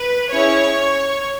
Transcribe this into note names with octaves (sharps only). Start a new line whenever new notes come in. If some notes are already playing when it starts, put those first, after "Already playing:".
Already playing: B4
C#4 E4 G#4 C#5 C#6